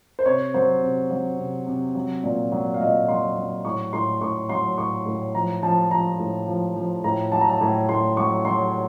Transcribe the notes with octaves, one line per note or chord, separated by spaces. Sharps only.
C5
C3 C#5
F#3 C5
C3
F#3
C3
C3
F#3
A#2
F#3
F5
A#2 D#5
F#3 C6
F#3
A2 C#6
A2 C6
A2 C#6
F#3 C6
A2 C#6
A2
F3 A#5
F3 A5
F3 A#5
A2
F3
F3
A2 A#5
F#3 A5
A#5
A5
A2 A#5
A2 C6
F#3 C#6
F#3 C6